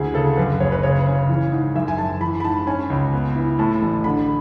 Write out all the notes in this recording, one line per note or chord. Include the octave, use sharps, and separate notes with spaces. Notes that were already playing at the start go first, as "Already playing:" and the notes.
Already playing: D2 E4 G#4
C#3 A4
F#2 B4
F#1 C#5
B4
C#3 C#5
C#3
E3
G#2
F#2 E5
G#5
F#2 A5
E3 B5
B5
G#2 A5
C#4 G#5
C#2
B3
E4
A2 A5
A1
D3 B5